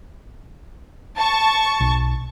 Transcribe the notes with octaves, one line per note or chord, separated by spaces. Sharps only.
A5 C#6
B1